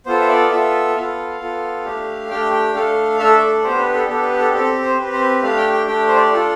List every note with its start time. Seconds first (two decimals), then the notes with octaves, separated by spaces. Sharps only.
0.06 B3 F4 A4 C5
0.21 E5
0.28 D5
0.50 B3 F4 A4 E5
0.95 B3 F4 A4 F5
1.40 B3 F4 A4
1.85 A3 D4 G4
2.30 A3 D4 G4 G5
2.52 G5
2.74 A3 D4 A4 F5
3.19 A3 D4 A4 E5
3.41 D5
3.63 B3 D4 G4 C5
3.79 B4
3.94 A4
4.08 B3 D4 G4 A4
4.23 B4
4.39 A4
4.53 C4 G4 A4
4.82 C5
4.98 C4 G4 B4
5.13 C5
5.21 B4
5.42 A3 D4 G4 F5
5.57 G5
5.73 G5
5.87 A3 D4 G4 G5
6.08 C5
6.17 D5
6.33 D4 F4 A4